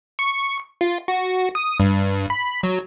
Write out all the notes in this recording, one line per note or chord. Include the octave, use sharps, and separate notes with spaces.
C#6
F4
F#4
D#6
G2
B5
F#3